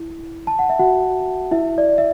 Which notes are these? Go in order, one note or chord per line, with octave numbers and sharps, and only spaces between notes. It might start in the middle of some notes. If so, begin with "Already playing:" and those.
Already playing: E4
A5
F#5
E5
F#4 F#5
E4 E5
D5
E5